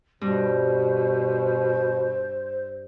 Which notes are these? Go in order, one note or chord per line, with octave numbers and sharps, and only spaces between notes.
G2 B2 C5